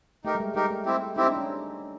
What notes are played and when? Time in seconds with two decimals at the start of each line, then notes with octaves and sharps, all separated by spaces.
0.25 A3 D#4 G4 A#4
0.35 G3
0.40 G#3
0.55 G3 D#4 G4 A#4
0.70 A3
0.86 C4 E4 G4
1.16 C4 D#4 E4 G4
1.27 D4
1.37 C#4